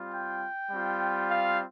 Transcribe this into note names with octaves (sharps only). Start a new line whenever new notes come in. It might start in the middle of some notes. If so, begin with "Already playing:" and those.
Already playing: G3 C4 F4
G5
G3 C4 F4
F5